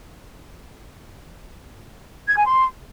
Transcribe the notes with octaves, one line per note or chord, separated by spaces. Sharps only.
G#6
G#5
C6